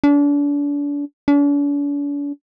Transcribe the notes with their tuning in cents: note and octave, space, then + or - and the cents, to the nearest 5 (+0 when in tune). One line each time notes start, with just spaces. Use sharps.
D4 -35
D4 -45